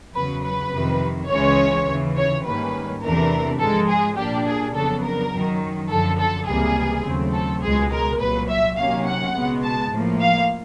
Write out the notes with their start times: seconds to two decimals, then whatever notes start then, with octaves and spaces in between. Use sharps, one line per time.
0.14 E2 C#3 F#3 B4
0.43 B4
0.72 F2 C3 D#3
1.29 C#2 C#3 E3 G#3 C#4 C#5
1.87 D#2 C#3 E3
2.16 C#5
2.44 G#2 D#3 G3 A#3 C#4 B4
3.03 E2 C3 E3 A3 D4 A#4
3.60 G#2 F3 G#3 A4
3.89 G#4
4.17 A#2 G3 A#3 D4 G4
4.47 G#4
4.74 F2 C#3 F#3 B3 D4 A4
5.04 A#4
5.32 F#2 D#3 F#3
5.89 F#2 D3 F3 A4
6.19 A4
6.47 C#2 C3 E3 G3 A#3 G#4
7.04 D#2 C#3 F#3 A3 C4
7.33 A4
7.62 C#2 B2 G#3 G#4
7.92 A#4
8.20 C2 A#2 F#3 B4
8.49 E5
8.77 C3 D#3 F#3 A#3 C#4 F5
9.06 F#5
9.35 C#2 B2 G#3 B3
9.63 A5
9.92 A2 F3 A#3
10.21 F5